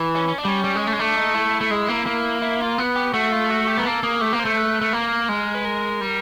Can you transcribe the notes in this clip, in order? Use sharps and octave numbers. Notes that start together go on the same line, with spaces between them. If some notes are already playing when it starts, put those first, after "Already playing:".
Already playing: E3
C#4
C#4
D4
G3 C#4
G3
G#3
A3
G#3
A3 D4
D#4
E4
A3
G#3
A#3
A#3
E4
F4
B3
G4
A3 F#4
F4
F#4
G4
B3 A#4
A#3 A4
A#3 G#4
A3 G4
A#3
C5
A3
B4
A3
A#3 A#4
G#3
B4
A#4
G3